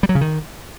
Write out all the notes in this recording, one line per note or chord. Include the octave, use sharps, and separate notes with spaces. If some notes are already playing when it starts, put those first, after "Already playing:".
G3
F#3
C#3
D#3